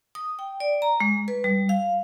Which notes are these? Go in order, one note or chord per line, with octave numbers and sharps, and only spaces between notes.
D#6
G5
D5
A#5
G#3
B4
G3
F5